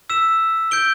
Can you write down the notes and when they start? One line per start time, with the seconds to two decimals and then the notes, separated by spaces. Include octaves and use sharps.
0.10 E6 B6 E7
0.71 G6 D7 G7